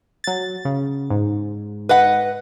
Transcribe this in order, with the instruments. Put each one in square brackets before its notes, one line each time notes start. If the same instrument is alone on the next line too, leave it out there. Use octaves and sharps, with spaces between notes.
[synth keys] F#3 A6
C#3
G#2
[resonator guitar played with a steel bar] B4 D#5 F#5